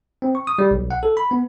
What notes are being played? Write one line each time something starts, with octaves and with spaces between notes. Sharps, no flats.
C4
C#6
D#6
G3
B1
F#5
A4
B5
B3